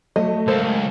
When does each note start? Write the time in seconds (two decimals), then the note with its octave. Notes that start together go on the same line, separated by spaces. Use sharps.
0.16 F#3 A3 D#5
0.48 C#2 A4 A#4 C5